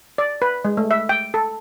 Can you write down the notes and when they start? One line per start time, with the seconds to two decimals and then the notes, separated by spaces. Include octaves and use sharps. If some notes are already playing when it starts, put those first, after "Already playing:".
0.18 D5
0.42 B4
0.65 G#3
0.77 A3
0.91 E5
1.09 G5
1.34 A4